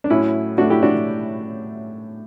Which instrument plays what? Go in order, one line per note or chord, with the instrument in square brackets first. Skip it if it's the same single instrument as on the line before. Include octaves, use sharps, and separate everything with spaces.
[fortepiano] D4
[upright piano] A2 F#3 A3 [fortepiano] C#4 E4
[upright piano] A2 F#3 A3 [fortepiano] D4 F#4
[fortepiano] E4 G4
D4 F#4